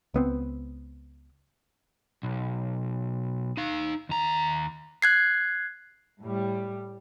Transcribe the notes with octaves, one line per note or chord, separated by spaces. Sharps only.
C#2 B3 C4
B1
D#4 F5
D#2 A#5
F#6 G#6 C7
A2 G3